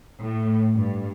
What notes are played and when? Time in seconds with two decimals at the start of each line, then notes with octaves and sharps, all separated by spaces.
0.21 A2
0.75 G2